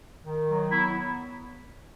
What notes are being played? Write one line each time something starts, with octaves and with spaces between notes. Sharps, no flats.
D#3
F#3
B3 E4